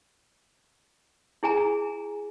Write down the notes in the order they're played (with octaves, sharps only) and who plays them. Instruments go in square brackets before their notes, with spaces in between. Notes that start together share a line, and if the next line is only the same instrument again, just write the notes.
[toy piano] E4 G#4 G#5 A#5